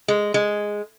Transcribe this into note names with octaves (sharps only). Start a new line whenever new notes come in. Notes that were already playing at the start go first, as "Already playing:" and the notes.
G#3
G#3